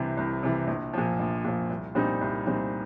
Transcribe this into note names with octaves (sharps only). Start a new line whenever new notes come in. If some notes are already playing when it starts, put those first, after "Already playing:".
Already playing: C2 C3 E3
C2
C3 E3
A#1
A#2 F3
A#1
A#2 F3
C2
A#2 G3 C4 D#4
C2
A#2 G3 C4 D#4